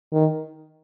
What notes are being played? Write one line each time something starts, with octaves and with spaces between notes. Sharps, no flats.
D#3